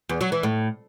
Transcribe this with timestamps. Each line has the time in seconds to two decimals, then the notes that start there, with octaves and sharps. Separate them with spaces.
0.09 E2
0.21 F#3
0.32 E3
0.43 A2